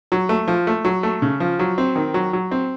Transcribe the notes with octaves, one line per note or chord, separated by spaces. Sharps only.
F#3
A3
F3
A3
F#3
A3
C#3
F3
F#3
C4
D#3
F#3
F#3
C4